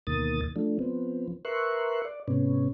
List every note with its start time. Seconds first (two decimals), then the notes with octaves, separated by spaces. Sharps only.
0.07 D2 B2 D#3 A#3 D#6 A6
0.56 F3 A3 D4
0.79 F3 B3 C4
1.45 A#4 B4 E5 C6 C#6 F#6
2.05 D5
2.28 G#2 C3 B3 C#4